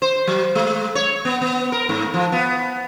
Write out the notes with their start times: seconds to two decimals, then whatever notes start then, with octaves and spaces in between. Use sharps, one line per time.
0.02 C5
0.27 F#3
0.55 G#3
0.95 C#5
1.25 B3
1.41 B3
1.72 A#4
1.89 G#2
2.14 F3
2.32 B3